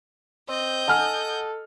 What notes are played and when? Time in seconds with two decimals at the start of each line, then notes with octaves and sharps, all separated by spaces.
0.49 C4 D#5 G6
0.88 A4 F#5 G#5 F6